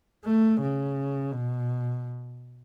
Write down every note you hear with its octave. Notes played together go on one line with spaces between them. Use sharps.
A3
C#3
B2